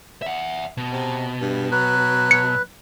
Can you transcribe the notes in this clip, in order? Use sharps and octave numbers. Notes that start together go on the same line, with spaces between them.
E5 F#5
B2
C3
G2
F#3 B4
C#7